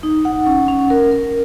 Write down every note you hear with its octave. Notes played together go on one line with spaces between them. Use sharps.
D#4
F#5
C#4
C#4
A#4
A#4